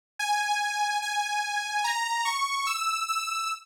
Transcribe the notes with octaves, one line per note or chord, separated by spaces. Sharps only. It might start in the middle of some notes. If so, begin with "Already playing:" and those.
G#5
G#5
A#5
C#6
E6
E6